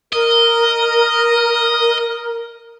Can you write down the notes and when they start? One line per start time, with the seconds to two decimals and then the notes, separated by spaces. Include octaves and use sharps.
0.13 A#4 D#5